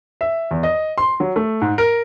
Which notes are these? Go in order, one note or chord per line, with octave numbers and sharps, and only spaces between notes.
E5
E2
D#5
C6
F#3
A3
G#2
A#4